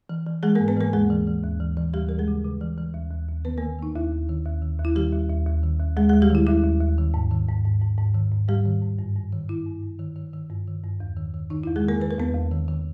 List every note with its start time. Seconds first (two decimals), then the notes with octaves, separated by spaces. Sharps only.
0.09 E3
0.26 E3
0.43 E3 G#3 G#4
0.55 G#2 A#3 A#4
0.68 B3 B4
0.77 E3 A#3 A#4
0.93 D#2 G#3 G#4
1.10 E3
1.27 E3
1.44 D#2
1.60 E3
1.77 E3
1.93 D#2 G3 G4
2.09 E3 A#4
2.19 G#3 G#4
2.28 C#3
2.44 C#3
2.61 E3
2.78 E3
2.94 D#2
3.11 D#2
3.28 D#2
3.45 D#3 B3 B4
3.58 D#3 A#3 A#4
3.79 D#3 D#4
3.96 D#2 E4
4.12 D#2
4.29 D#3
4.45 D#2
4.62 D#3
4.80 D#2
4.85 E4
4.95 D#3 G3 G4
5.13 D#2
5.30 D#2
5.47 D#2
5.64 D#3
5.80 D#2
5.97 D#2 G#3 G#4
6.09 D#2 G#3 G#4
6.22 G3 G4
6.30 D#3 E4
6.47 D#2 E4
6.64 D#2
6.80 D#2
6.98 D#3
7.14 G#2
7.31 D#3
7.48 G#2
7.65 G#2
7.82 G#2
7.98 G#2
8.15 D#3
8.32 G#2
8.48 G#2 G3 G4
8.65 D#3
8.82 G#2
8.99 G2
9.16 G2
9.32 D#3
9.49 D#3 E4
9.66 G2
9.83 G2
9.99 D#3
10.16 D#3
10.34 D#3
10.50 G2
10.67 D#3
10.84 G2
11.00 E2
11.17 D#3
11.34 D#3
11.50 D#3 D#4
11.63 E2 E4
11.76 G#3 G#4
11.84 D#3 A#3 A#4
12.01 D#3 B4
12.11 A#4
12.18 E2 B3 B4
12.35 E2
12.51 D#3
12.68 D#3